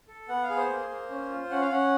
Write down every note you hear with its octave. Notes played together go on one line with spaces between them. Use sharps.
A4
B3 F#5
F5
G#4
C5
A#3
A#3
C#4
F4
C#4 F#5
F5
C#4 F#5